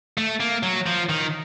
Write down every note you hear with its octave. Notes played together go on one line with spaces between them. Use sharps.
A3
A#3
F#3
F3
D#3